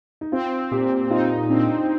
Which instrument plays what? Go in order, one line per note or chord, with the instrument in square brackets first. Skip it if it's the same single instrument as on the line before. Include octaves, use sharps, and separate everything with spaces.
[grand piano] D#4
[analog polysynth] C4 [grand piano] F4
[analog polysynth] A#2 [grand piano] G4
[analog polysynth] D#4 [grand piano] F4
[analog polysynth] C4 [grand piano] D4